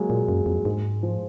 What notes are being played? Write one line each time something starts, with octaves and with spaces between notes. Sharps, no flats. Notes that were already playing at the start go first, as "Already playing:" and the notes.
Already playing: F#3 G#3 A#3
A#2
F#2
F2
G#2 G#3
F3